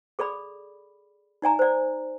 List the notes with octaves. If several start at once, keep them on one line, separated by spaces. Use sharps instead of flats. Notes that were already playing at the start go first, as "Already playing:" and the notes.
G#4 A4 D5 B5
D#4 D5 G#5 A#5
C5 D5